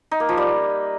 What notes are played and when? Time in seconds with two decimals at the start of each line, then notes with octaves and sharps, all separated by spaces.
0.11 D#4
0.20 A#3
0.29 F3
0.37 G3